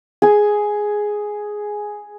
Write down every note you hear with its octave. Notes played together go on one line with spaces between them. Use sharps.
G#4 G#5